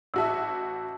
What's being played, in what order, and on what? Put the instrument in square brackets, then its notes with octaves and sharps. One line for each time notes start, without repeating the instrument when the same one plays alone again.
[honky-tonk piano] A1 F#4 E5 [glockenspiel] A5 E6